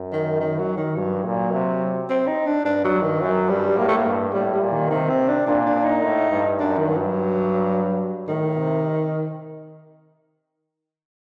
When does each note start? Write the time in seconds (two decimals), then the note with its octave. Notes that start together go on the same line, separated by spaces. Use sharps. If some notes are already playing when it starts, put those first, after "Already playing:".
Already playing: F#2
0.12 D#3
0.40 D#3
0.59 F#3
0.77 D#3
0.96 G2 F#3
1.24 A#2
1.52 C3
2.09 C4
2.27 D#4
2.46 D4
2.65 G2 D4
2.84 F#3
2.93 G2
3.02 D#3
3.21 F#2 F#3
3.49 G2 G3
3.78 A2 A#3
3.88 A3
3.97 A#3
4.06 G2
4.34 A2 G3
4.53 G3
4.62 A#2
4.72 D#3
4.90 C3 D#3
5.09 C4
5.28 D4
5.46 A#2 D4
5.66 D4
5.75 A#2
5.84 D#4
6.04 A2
6.31 G2
6.59 F#2 D4
6.78 D#3
6.88 G2
6.97 F#3
8.28 A2 D#3
8.57 C3